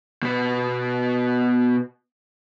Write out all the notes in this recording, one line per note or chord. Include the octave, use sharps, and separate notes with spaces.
B2 B3